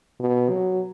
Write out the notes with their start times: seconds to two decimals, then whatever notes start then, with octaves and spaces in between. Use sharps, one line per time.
0.20 B2
0.49 F#3